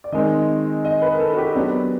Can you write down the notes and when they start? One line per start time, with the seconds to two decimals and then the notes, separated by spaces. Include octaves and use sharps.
0.04 D5
0.12 D#3 G#3 C4 D#4 D#5
0.85 D#5
1.02 B4
1.14 A#4
1.20 A4
1.33 F#4
1.38 G4
1.56 F#3 B3 D4 G4